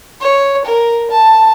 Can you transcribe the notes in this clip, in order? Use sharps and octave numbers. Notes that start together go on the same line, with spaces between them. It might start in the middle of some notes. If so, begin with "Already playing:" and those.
C#5
A#4
A5